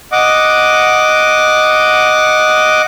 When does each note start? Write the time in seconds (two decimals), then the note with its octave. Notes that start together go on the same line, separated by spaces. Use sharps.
0.12 D#5 F#5 D6